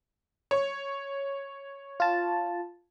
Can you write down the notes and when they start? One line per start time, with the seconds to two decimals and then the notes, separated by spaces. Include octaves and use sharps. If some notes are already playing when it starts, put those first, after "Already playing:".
0.51 C#5
2.00 F4 A5